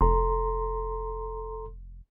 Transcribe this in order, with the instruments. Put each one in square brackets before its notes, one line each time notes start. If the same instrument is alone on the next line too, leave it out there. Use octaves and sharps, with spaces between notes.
[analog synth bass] F1 [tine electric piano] A4 A#5 C6